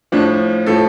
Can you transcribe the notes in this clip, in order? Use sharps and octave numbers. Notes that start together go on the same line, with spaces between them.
A2 F3 D4
A2 F3 A4